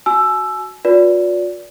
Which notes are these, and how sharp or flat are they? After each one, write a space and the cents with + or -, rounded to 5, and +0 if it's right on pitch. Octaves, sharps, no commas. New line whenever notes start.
F#4 +0 G#5 +45 E6 +10
F4 +45 B4 -30 D5 -25